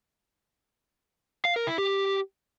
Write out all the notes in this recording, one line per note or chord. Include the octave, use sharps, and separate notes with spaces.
F5
A#4
E4
G4